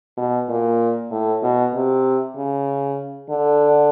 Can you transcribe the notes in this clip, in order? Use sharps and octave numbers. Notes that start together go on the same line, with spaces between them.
B2
A#2
A2
B2
C3
C#3
D3